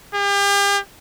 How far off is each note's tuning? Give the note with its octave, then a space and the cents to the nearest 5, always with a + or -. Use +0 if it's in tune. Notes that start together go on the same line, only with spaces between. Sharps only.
G4 +40